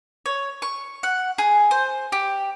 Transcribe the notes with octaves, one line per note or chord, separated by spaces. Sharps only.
C#5
C#6
F#5
G#4
C5
G4